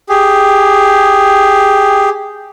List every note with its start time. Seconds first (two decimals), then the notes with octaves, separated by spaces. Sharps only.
0.09 G4 G#4